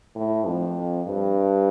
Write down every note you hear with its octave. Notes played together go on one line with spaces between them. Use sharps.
A2
F2
G2